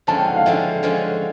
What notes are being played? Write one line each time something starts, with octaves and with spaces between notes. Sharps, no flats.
D3 F3 G#3 C#4 A5
G5
F#5
F5
D3 F3 G#3 C#4 E5
D3 F3 G#3 C#4